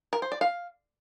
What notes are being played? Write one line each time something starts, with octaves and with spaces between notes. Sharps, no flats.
A#4
C5
D5
F5